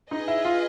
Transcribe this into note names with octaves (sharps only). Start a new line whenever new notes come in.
D#4 G#4 B4 D#5
E4
F4